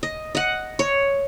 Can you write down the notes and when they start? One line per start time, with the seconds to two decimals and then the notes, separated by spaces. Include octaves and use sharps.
0.03 D#5
0.35 D#5 F#5
0.79 C#5